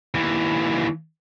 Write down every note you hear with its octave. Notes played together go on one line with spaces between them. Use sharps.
D#2 E3